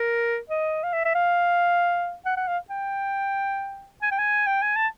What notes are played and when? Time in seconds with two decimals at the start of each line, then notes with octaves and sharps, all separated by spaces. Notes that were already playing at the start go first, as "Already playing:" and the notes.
Already playing: A#4
0.50 D#5
0.84 F5
0.93 E5
1.05 E5
1.15 F5
2.26 F#5
2.37 F#5
2.48 F5
2.70 G5
4.02 G#5
4.12 G5
4.19 G#5
4.47 G5
4.62 G#5
4.76 A5